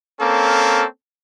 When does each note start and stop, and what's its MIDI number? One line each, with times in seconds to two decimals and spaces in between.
0.21 0.85 58
0.21 0.85 60
0.21 0.85 61
0.21 0.85 69